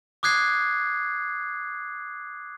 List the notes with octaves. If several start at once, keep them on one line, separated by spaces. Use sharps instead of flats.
D6 D#6 F#6 G#6 C7